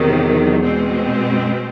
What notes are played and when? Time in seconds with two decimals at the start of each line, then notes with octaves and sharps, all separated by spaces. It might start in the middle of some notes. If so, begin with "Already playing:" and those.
Already playing: E2 C3 D#3 F#3
0.62 B2 G#3 C4
1.23 F#2